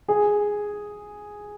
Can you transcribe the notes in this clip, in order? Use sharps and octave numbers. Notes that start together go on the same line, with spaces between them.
G#4